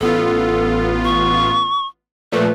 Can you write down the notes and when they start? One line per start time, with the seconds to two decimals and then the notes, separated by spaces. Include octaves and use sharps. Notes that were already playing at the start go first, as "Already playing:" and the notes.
0.01 A1 B3 F4 A4
1.04 C#6
2.32 A#2 F3 A3 B4